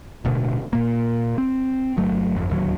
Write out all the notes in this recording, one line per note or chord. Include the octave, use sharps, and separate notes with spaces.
D1 D2 B2
A#2 A#3
C4
G1 F#3 A3
G1 F2
D1 D#2 F#3